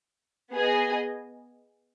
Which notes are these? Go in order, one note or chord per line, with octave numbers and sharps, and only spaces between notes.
B3 G#4 D#5 G#5